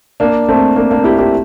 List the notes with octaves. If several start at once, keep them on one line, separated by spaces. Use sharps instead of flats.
A#3 D4
A3 C4
A#3 D4
A#3 D4
E4 G4
E4 G4